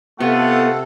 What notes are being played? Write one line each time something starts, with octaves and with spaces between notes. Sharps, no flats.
C3 A3 B3 F4 A4 F#5